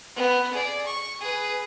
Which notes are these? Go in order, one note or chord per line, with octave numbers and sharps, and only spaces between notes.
B3
G#4 D5
C#6
G#4 B4